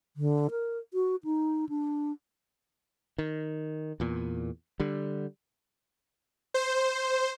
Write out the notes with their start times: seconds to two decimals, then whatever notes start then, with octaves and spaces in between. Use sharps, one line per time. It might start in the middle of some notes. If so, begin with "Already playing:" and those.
0.16 D3
0.51 A#4
0.94 F#4
1.24 D#4
1.69 D4
3.18 D#3
4.00 E2 A#2
4.80 D3 G3
6.54 C5